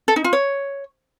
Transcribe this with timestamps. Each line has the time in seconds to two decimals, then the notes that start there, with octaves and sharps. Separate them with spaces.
0.08 A4
0.16 D#4
0.24 F4
0.33 C#5